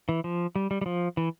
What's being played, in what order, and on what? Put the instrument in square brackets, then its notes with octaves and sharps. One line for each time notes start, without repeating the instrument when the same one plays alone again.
[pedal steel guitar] E3
F3
G3
G3
G3
F3
E3